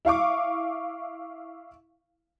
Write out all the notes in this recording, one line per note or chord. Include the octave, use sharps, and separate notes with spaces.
E4 F5 C#6 D6